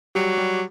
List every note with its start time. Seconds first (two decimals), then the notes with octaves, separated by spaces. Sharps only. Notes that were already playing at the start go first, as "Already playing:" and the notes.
0.15 F#3 G3 G4
0.38 G3 G4